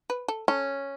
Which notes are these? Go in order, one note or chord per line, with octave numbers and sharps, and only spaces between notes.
B4
A4
C#4 A4